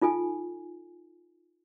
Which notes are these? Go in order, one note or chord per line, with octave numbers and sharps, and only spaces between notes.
D#4 F4 A4 G#5